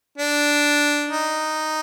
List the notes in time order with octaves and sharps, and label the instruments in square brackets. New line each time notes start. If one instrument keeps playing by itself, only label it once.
[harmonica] D4
D#4